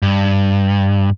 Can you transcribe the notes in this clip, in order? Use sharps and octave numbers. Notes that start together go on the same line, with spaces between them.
G2